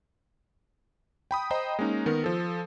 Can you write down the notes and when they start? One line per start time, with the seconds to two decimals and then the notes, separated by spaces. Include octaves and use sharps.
1.31 G5 B5 D#6
1.50 C5 D#5 G5 A#5 B5
1.79 G#3 A#3 C#4 D#4
2.06 D#3 B3 A#4
2.24 F3 A4